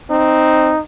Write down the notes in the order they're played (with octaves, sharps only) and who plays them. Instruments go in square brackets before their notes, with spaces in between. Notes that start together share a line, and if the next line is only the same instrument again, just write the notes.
[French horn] C4 [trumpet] D#4